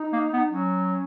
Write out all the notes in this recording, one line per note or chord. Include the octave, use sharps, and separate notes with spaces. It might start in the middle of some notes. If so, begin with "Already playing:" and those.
Already playing: D#4
A#3
B3
F#3 C#4